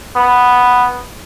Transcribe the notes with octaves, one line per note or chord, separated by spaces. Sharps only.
B3